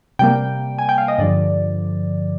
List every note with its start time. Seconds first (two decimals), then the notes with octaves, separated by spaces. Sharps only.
0.19 C3 G3 A#3 G5
0.78 G#5
0.89 G5
0.98 F5
1.08 D#5
1.18 G2 D3 F3 D5